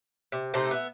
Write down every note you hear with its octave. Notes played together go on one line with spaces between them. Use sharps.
C3
C3 A3 D#4 C5
B3 E5